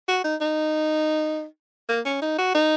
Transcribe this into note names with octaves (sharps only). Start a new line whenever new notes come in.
F#4
D#4
D#4
A#3
C#4
D#4
F#4
D#4